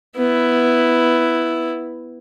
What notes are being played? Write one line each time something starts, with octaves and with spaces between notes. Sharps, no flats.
B3 E4